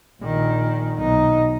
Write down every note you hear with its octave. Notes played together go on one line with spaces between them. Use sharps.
A#1 D#3
B1 D#4